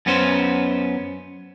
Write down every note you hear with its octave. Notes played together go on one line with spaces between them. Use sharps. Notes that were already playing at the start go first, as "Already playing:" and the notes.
F#2 B3 C#4 C5